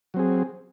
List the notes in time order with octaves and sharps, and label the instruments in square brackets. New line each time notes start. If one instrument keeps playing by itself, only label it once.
[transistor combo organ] F#3
C4
G#4